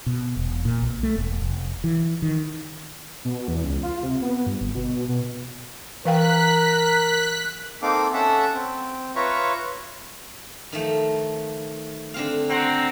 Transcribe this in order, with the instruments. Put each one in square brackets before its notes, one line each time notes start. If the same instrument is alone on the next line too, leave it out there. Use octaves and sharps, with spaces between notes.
[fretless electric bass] B2
E1
A#2
B1
A3
E1
F1
E3
D#3
[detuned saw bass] B2
E2
C#2
F4
C3
B3
G2
G1
B2
B2
[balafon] E3 F5 G5 [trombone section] A#4 [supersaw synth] F#6 B6
[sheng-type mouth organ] A#3 C4 D#4 A4 F5 D6
C#4 A4 E5 F#5 A5
C4
F4 B4 C#5 E5 A#5 C#6
[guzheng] D#3 F3 A3
D3 C4 F5
[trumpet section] C4 F#5 A#5 [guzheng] F#4